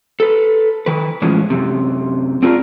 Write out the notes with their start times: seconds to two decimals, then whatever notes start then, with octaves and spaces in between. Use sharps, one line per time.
0.20 A4 B4
0.86 D#3 B4
1.22 A2 E3 F3 G#3 C#4
1.50 F#2 C3
2.43 C4 D4 F4 G#4 A#4